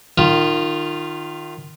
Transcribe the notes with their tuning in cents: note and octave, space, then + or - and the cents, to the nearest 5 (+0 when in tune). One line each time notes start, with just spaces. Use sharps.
D#3 -20 F4 +0